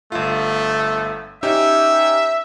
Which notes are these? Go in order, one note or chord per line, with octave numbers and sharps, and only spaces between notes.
G1 A3 F4
C#4 D#4 G4 E5